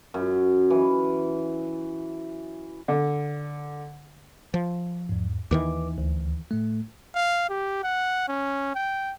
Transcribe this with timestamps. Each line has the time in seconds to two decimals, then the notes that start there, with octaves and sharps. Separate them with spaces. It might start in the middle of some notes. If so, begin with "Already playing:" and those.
0.14 F#2
0.70 E3
2.88 D3
4.54 F3
5.09 E2 G#2
5.51 D#2 D#3 E3 B4 D6
5.98 D2
6.51 A2 A3
7.15 F5
7.49 G4
7.83 F#5
8.28 C#4
8.75 G5